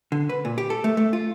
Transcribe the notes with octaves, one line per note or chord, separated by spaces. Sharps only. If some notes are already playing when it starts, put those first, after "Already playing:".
D3
B4
A#2
G4
A4
A3
A3
F4